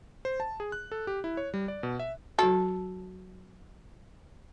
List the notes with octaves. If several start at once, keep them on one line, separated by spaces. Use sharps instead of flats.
C5
A5
G#4
F#6
A4
G4
E4
C#5
G3
D5
B2
E5
F#3 F#4 A4